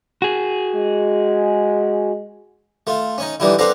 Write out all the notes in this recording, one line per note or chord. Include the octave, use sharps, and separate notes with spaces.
F#4 G#4
G#3
A3 F4
C#4 D#4
D3 E3 G3 D#4 E4
B3 C4 D4 A4 F5 A#5